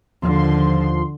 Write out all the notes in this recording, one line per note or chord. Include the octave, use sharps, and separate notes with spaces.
D#2 D3 F3 C6